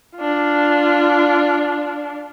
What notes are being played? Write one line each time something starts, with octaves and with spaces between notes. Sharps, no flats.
D4 F4